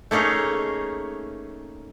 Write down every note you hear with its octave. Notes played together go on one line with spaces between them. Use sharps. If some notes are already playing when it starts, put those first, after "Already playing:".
A3 A#3 C#4 D#4 G#4